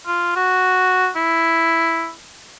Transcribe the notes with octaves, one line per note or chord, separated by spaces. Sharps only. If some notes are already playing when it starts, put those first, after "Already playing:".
F4
F#4
E4